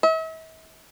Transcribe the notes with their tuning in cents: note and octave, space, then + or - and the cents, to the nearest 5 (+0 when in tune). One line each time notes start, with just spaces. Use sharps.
E5 -45